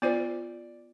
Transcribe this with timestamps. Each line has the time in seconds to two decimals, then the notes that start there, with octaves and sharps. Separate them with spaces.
0.02 B3 F4 C5 D5